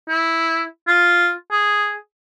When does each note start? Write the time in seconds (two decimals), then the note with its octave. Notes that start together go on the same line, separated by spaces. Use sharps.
0.09 E4
0.88 F4
1.51 G#4